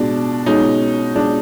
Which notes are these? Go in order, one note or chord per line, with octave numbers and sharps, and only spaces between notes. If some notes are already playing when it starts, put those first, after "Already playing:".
Already playing: B2 G#3 D4
B2 G#3 C#4 D#4
B2 G#3 D4